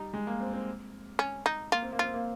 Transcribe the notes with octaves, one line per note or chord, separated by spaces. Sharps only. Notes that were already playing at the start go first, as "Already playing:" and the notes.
Already playing: G3 D#4
G#3
A#3
C4
C4
C#4
D#4
A#3 F4
C4
A#3
C4 F4
A#3